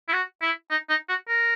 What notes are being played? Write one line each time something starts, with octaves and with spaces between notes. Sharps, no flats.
E4
F#4
E4
D#4
D#4
F#4
A#4